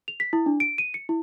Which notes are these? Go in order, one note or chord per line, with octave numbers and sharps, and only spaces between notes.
F7
B6
E4
D4
D7
D#7
C#7
E4